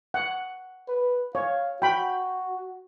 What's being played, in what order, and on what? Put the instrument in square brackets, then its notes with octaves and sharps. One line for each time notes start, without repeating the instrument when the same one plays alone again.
[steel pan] F#5
[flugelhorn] B4
[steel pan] C#5 [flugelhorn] F5
[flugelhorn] F#4 [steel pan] G5 B5